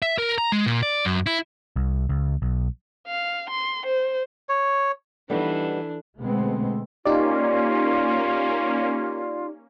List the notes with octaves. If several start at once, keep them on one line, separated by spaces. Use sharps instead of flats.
E5
A#4
A#5
G#3
A#2
D5
F#2
E4
C2
C#2
B1
F5
C6
C5
C#5
E3 G3 B3 D4 D#4 A4
B2 D3 G#3 A3 B3 C4
A#3 C#4 D#4 F4 G4 D5